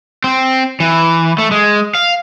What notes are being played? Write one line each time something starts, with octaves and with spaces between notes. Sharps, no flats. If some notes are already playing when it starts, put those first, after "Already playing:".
C4
E3
A3
G#3
F5